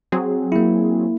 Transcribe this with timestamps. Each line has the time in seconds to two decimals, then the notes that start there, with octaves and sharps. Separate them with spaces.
0.12 F#3 C4 G#4
0.52 A#3 E4